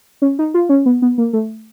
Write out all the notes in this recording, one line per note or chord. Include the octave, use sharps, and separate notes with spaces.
C#4
D#4
F4
C#4
B3
B3
A#3
A3